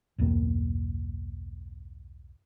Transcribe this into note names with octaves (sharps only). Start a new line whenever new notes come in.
B1 E2 G2 A#3